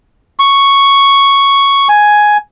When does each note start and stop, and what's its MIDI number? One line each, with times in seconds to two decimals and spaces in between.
0.39 1.88 85
1.89 2.37 80